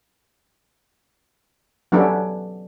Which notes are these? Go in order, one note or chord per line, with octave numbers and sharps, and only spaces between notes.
F#3 B3 C#4 D4 G4 A4